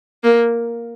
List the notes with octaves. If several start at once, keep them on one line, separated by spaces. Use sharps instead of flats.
A#3